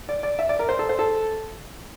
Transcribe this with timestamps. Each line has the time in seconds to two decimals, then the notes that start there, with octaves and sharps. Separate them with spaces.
0.09 D5
0.23 D5
0.39 E5
0.49 D5
0.59 A#4
0.69 C5
0.79 A4
0.89 C5
0.99 A4